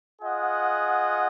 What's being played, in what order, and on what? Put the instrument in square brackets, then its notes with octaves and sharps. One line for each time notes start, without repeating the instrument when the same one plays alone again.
[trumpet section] F4 G#4 D#5 F#5